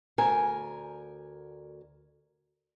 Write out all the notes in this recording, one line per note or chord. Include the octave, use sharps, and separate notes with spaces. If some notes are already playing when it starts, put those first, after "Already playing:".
D2 A#4 G#5